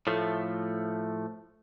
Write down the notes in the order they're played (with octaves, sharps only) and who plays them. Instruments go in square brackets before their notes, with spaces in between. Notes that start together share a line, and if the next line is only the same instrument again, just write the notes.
[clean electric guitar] A2 F3 A3